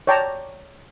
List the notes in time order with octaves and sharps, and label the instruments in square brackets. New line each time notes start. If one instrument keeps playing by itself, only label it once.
[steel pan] C#5 D5 G5 A5 A#5